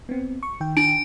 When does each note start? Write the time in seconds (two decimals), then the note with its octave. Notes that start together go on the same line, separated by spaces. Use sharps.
0.09 B3 C4
0.43 C#6
0.61 D#3 G5
0.77 D4 D7